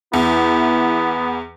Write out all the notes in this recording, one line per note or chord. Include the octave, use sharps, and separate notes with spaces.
E2 B3 E4